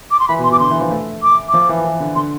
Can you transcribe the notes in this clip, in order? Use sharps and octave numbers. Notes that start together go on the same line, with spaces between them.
D6
C6
E3 B5
B2
C6
B2 D6
D3 C6
E3
F3
A3
D6
F3 D6
E3
E3
D3
D3 C6